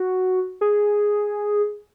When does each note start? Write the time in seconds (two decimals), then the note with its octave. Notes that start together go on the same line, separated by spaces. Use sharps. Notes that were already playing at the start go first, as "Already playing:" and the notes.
Already playing: F#4
0.61 G#4